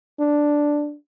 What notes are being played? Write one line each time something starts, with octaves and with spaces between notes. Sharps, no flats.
D4